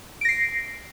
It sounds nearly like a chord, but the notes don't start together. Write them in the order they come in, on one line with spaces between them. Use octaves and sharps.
D7 A#6 C7